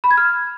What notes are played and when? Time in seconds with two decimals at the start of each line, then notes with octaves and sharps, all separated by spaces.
0.04 B5
0.11 G#6
0.17 F6